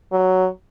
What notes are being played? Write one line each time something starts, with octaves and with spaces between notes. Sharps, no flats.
F#3